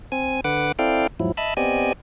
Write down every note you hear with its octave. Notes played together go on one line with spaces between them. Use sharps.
C4 G#5
D3 B4 F#5 D6
C4 E4 A4 D5 F5 G5
E2 G#2 F3 F#3 E4
D#5 E5 A5 B5
B3 C4 G4 D5 D#5 G#5